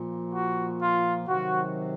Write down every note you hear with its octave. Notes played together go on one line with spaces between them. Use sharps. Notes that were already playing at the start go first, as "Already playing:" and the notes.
Already playing: A#2 F3
F#4
F4
C3 D#3 F#3 F#4